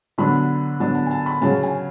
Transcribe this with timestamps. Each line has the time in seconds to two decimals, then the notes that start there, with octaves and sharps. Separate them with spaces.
0.18 D3 F#3 B3 D4 B5
0.79 D3 F#3 B3 D4 A5
0.95 A5
1.07 G#5
1.11 A5
1.26 B5
1.41 C#3 F#3 C#4 A5
1.63 G#5